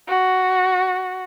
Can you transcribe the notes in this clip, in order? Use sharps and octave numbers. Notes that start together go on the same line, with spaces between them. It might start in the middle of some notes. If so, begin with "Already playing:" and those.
F#4